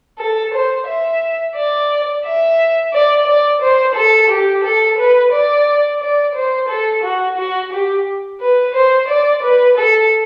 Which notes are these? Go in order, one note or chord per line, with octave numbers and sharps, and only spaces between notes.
A4
C5
E5
D5
E5
D5
D5
C5
A4
G4
A4
B4
D5
D5
C5
A4
F#4
F#4
G4
B4
C5
D5
B4
A4